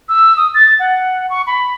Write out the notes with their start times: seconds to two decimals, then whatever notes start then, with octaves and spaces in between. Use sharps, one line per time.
0.09 E6
0.37 D#6
0.55 A6
0.80 F#5
1.30 C#6
1.47 B5